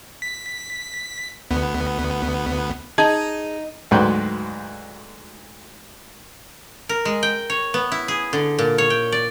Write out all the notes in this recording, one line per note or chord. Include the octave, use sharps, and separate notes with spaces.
B6
D2 B3
D#4 G#4 A5
D2 G#2 F#3 B4 G5 C6
A#4
G#3
G5
C#5
B3
E4
G#4
D3
A#2
C#5
G5
D5